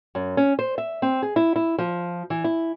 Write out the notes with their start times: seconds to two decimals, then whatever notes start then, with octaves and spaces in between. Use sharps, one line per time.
0.15 F#2
0.37 C#4
0.59 C5
0.78 E5
1.02 C4
1.22 G#4
1.36 E4
1.56 E4
1.78 F3
2.30 E3
2.44 E4